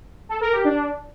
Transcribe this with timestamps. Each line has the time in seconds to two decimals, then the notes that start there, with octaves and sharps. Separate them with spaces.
0.29 A4
0.41 A#4
0.52 G4
0.64 D4